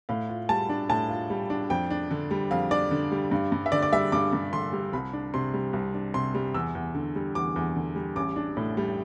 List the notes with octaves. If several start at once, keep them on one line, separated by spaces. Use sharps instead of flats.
A2 F5
F4
G3 A5
D4
A2 A5
F4
G3
D4
F2 G5
D4
D3
G3
F2 F5
D4 D5
D3
G3
G2
G2
E5
D3 D5
D5
G3 E5
G2 D6
G2
D3 C6
G3
C2 B5
D4
C3 C6
G3
C2
D4
C3 C6
G3
E2 E6
E2
D3
G3
E2 D6
E2
D3
G3
A1 D6
D4
A2
G3